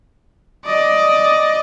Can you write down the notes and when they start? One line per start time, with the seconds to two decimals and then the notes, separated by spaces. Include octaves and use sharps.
0.66 D5 D#5